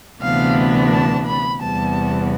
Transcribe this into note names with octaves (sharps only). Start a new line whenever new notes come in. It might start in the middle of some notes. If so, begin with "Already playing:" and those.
D2 C3 E3 B3 D4 F5
A5
B5
E2 C3 G3 B3 A5